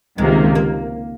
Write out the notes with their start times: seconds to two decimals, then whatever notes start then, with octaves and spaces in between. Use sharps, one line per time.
0.18 C#2 C3 D#3 G#3 A#3
0.55 A#3